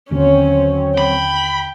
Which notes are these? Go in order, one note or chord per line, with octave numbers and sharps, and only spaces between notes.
D#2 D3 F#3 C4 C#4 C#5
G5 B5